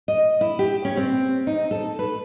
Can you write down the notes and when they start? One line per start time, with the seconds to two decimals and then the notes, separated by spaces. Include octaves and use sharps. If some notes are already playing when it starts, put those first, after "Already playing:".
0.08 D#5
0.41 E4
0.59 G4
0.85 C#4
0.97 C4
1.47 D#4
1.71 A4
1.99 B4